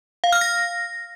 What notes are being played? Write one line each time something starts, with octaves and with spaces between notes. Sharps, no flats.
F5
F6
A#6